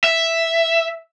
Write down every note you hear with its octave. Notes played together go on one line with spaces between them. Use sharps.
E5